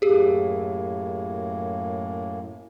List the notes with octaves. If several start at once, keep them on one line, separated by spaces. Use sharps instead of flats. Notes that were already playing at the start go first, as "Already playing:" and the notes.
F#2 A2 A#3 G4 G#4